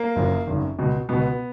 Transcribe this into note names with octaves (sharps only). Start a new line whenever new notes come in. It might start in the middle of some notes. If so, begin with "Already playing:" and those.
Already playing: A#3
F#1 F#2 F3
G#1 F#2 C#3
C#2 B2
C#2 B2 B3